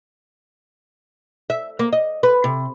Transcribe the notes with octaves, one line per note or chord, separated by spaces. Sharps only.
E5
A#3
D#5
B4
C3